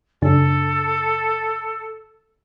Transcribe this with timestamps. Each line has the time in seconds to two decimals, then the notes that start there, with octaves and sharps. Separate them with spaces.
0.22 F#2 C#3 D4 A4